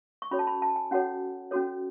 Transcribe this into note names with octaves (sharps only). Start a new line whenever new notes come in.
C#6
C#4 F#4 A4 C#5 B5
A5
B5
A5
G#5
C#4 F#4 A4 C#5 F#5
C#4 F#4 A4 C#5